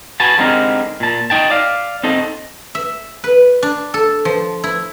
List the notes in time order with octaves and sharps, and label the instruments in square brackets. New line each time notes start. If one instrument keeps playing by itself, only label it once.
[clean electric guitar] F#4 B4 G#5 A5
D3 G3 G#3 C4 D#4 A#4
A#2 A5
D#4 G5 A5
D5 F5
C4 D#4 A4
[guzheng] E5
B4
D4
A4
F3
E4